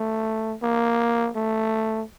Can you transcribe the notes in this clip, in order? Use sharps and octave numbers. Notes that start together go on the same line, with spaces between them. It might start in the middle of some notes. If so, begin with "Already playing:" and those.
Already playing: A3
A#3
A3